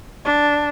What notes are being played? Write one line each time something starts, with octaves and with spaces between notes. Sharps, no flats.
D4